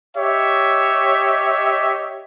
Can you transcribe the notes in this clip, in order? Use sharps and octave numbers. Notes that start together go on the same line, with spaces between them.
G4 C#5 D#5 E5